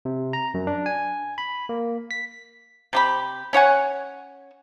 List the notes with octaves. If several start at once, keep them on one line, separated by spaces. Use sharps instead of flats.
C3
A#5
F#2
D4
G#5
B5
A#3
B6
C3 G4 B5
C#4 C#5 F#5 G#5